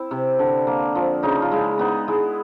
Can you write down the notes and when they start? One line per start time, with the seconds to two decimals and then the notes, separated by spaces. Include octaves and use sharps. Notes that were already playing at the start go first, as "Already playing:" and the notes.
Already playing: C4 E4
0.11 C3
0.39 D3
0.67 A#3
0.95 F3
1.23 C#3 D#4
1.42 F4
1.51 G#3 E4
1.79 B3 D#4
2.08 G#3 E4